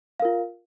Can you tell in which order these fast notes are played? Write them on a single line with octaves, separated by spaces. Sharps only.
F5 A#4 F4